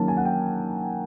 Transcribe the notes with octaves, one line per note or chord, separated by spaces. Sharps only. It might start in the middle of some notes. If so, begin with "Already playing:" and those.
Already playing: D#3 F#3 A#3 C#4 A5
G#5
F#5
G5